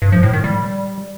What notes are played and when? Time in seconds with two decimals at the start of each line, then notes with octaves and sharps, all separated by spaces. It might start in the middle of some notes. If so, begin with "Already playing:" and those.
0.02 G2
0.12 F3
0.23 A2
0.33 D#3
0.44 G3